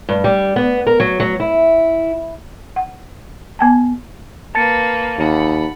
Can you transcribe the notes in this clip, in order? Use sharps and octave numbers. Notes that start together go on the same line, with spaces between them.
G2
G3
B3
A#4
F#3
F#3
E4
F#5
B3 G5 A5
A#3 B4 A5 A6 C#7
D#2 F#5 B5